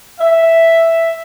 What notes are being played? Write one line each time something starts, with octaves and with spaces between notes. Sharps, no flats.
E5